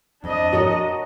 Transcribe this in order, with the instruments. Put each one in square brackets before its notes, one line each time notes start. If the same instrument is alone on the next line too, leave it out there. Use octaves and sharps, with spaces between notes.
[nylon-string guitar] F2 [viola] D4 D#5
[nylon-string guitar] F#4 A#4 C#5